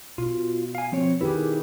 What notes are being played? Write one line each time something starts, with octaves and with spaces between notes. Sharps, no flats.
B2 F4
F5 G#5
F3 C4 C#5
D#3 E4 G4 G#4 B4